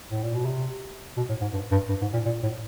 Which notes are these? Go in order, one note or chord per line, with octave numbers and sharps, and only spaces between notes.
A2
A#2
B2
C3
B2
A2
G#2
G2
G2
G2
G#2
A#2
A#2
A2